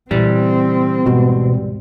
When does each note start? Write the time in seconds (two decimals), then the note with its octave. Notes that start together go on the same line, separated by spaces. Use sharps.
0.11 A#2 C#3 E3 G3 C4
1.06 D2 G#2 B2